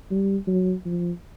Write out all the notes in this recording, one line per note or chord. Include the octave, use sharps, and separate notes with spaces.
G3
F#3
F3